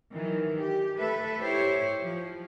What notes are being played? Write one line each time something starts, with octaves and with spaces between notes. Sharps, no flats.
D#3 E3 F#3
G4
A3 A4 B4 E5
E4 G4 C5 C#5
F3